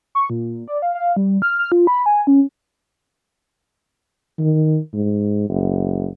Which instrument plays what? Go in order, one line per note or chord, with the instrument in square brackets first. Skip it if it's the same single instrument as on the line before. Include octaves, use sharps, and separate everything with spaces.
[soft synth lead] C#6
A#2
D5
F5
F5
G3
F6
F6
F4
B5
G#5
C#4
[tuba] D#3
G#2
F#1